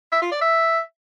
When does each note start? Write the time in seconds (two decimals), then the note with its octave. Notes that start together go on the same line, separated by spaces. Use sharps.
0.12 E5
0.22 F4
0.32 D5
0.42 E5